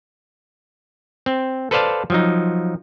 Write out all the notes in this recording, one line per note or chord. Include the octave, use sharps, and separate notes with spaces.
C4
A4 B4 C5 D5 F5 A5
F3 F#3 D#4